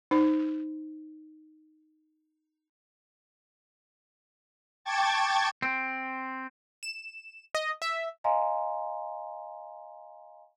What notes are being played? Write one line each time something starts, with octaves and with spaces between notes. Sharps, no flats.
D#4 C5
G5 A5 C#6 D6 G#6 A6
C4
E7
D#5
E5
D#5 F5 G#5 A#5 C6